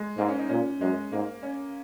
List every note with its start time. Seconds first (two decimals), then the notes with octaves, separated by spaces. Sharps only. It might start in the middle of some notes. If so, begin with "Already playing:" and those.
Already playing: G#3
0.18 G#2 A#3
0.28 C#4
0.39 D#4
0.49 A#2 C#4
0.81 F#2 G#3
1.12 G#2 A#3
1.43 C#4